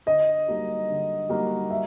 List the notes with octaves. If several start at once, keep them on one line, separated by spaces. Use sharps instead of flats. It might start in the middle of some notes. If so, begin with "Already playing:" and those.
D3 D#5
G3 A#3 D#4 F#4
D3
G3 A#3 D#4 F#4
E5